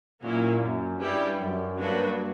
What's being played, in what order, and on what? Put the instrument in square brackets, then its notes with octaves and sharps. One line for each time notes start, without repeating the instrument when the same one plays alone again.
[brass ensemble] A#2 [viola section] F#3 A#3 C#4 E4
[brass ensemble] F#2
[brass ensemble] G2 [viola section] G3 C#4 E4 G4
[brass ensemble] F#2
[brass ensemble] G2 [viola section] F#3 A#3 D4 F#4 B4